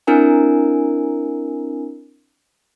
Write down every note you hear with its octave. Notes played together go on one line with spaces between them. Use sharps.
C4 D4 E4 A#4 G#5